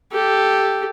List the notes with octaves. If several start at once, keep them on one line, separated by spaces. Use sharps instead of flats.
G4 A4